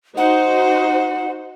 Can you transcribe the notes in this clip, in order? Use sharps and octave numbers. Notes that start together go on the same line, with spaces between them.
D#4 F#4 C5 F#5